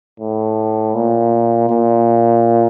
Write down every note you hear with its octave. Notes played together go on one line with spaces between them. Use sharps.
A2
A#2
A#2